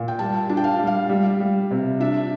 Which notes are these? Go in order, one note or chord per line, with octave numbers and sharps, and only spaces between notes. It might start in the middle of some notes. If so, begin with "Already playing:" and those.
Already playing: A#2
G5
G3 A5
D4 A5
G5
F5
G3
F5
G3
G3
C3
D4 E5